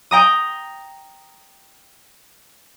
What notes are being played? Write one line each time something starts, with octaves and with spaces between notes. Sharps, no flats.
G5 A#5 D#6